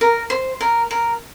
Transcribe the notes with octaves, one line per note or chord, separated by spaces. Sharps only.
A#4
C5
A#4
A#4